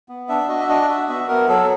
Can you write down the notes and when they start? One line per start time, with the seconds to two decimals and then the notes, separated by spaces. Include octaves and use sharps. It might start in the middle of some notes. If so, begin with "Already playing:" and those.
0.09 B3
0.29 D4 E5
0.49 F#4 D#5
0.60 E5
0.68 D4 D#5
0.88 F#4 E5
1.08 B3 E5
1.28 B3 A#4
1.48 F#3 A4